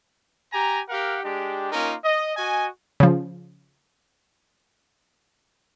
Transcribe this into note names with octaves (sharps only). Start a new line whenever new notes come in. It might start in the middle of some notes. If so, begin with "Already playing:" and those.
G4 G#5 A#5
G4 A#4 F5 F#5
G#3 D4 G4
A#3 C#4 D#4 F4 A#4
D#5
F#4 D#5 G#5
C#3 F3